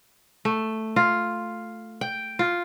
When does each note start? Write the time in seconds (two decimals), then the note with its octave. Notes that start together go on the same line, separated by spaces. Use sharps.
0.45 A3
0.96 F4
2.01 G5
2.39 F4